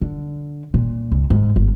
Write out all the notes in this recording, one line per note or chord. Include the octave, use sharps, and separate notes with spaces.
D3
A#2
C#2
G#2
G1